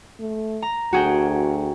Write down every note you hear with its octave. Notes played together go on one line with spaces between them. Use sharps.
A3
A#5
D2 F#4 G#4 G5